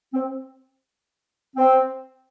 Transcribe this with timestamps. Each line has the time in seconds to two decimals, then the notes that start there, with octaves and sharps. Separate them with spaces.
0.13 C4
1.56 C4